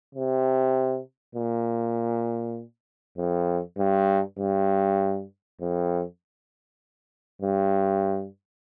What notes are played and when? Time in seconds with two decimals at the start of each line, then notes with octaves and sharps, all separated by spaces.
0.15 C3
1.35 A#2
3.17 F2
3.78 G2
4.39 G2
5.61 F2
7.42 G2